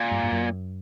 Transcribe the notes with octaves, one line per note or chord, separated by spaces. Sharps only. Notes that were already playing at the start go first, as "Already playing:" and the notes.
Already playing: A#2
G2
G2
F#2